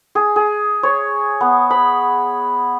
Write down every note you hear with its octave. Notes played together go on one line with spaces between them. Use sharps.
G#4
G#4
C#5
B3
B5